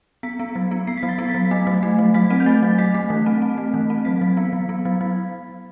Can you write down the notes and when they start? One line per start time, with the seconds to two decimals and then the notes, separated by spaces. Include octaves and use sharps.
0.23 B3 B6
0.39 B3
0.56 F#3
0.71 B3
0.87 B3 C7
0.98 B6
1.03 F#3
1.09 A6
1.19 B3
1.30 B6
1.35 F#3
1.51 A3
1.67 F#3
1.83 A3
1.99 F#3
2.14 F#3 B6
2.30 C4
2.40 G6
2.46 A3 A6
2.63 F#3
2.78 A3 B6
2.95 A3
3.10 E3
3.26 C4
3.42 C4
3.58 A3
3.74 E3
3.90 C4
4.05 F#3 B6
4.21 F#3
4.37 B3
4.53 F#3
4.69 B3
4.85 F#3
5.01 F#3